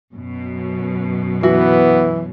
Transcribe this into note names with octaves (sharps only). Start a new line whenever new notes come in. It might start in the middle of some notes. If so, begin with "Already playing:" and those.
F#2 B2
E3 B3 F#4